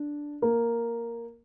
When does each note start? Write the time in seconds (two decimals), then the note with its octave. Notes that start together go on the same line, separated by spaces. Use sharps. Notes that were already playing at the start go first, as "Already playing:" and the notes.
Already playing: D4
0.42 A#3